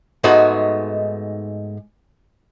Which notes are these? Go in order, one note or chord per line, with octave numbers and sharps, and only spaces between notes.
G#2 G#3 A3 B3 D#4 F#4